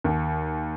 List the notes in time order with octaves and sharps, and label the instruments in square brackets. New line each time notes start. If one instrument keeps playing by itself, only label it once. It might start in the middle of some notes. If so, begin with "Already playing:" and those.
[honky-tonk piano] D#2